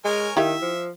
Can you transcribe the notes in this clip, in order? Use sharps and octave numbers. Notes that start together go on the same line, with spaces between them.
G#3 A#4 C#5 G#5
D#3 E4 G4 E5 F5
F3